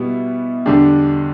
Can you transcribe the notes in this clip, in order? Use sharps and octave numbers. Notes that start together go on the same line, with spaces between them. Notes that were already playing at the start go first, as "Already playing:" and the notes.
Already playing: B2 G3 B3 E4
E2 D3 G3 D4 G4